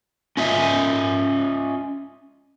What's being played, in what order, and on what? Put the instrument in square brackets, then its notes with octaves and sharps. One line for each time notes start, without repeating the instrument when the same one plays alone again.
[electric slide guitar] C#4 F4 D#5 E5